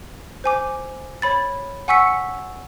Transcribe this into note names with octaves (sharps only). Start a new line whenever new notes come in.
C5 G#5 D6
C#5 B5 A6
F#5 G#5 C#6 E6 B6 C#7